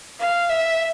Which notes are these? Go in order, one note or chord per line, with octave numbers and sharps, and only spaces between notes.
F5
E5